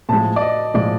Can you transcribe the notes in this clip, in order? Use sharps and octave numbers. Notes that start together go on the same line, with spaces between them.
A2 F3 G#3 A5
D5
D#5
A2 F3 G#3 D5